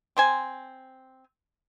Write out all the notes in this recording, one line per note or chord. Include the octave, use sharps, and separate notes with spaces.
C4 C5 G#5